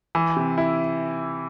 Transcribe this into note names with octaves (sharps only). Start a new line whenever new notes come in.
E3
C3
E4